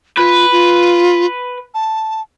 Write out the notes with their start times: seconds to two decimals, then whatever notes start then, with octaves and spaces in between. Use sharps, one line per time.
0.17 F4 B4
0.52 F4
1.74 A5